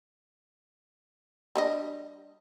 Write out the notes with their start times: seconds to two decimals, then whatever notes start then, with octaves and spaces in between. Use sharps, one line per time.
1.56 G3 D4 D#5